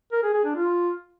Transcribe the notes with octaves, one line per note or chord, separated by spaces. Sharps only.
A#4
G#4
G#4
D4
F4